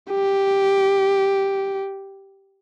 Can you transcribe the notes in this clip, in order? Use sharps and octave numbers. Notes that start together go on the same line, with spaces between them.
G4